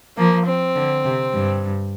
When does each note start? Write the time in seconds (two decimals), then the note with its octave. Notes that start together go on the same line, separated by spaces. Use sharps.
0.17 F3 A#3
0.46 C4
0.75 D3
1.05 C3
1.33 G2